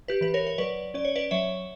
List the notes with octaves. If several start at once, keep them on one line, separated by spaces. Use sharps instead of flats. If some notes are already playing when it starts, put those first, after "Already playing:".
G4 B4
E3 B4
A#4 C#5
C#5
F#3 B4 D5
C#4 D5
C#5
B4 D5
F#3 C#5 E5